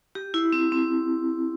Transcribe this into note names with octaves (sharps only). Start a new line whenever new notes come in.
G4
E4
C4
C4